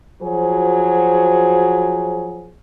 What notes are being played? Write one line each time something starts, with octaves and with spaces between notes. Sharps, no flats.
F3 F#3 F#4 G#4 C5